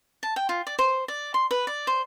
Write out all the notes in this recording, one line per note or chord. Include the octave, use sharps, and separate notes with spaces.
A5
G5
F4
D5
C5
D5
C6
B4
D5
C5